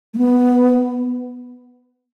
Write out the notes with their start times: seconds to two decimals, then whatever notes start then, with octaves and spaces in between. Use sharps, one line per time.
0.14 A3
0.18 B3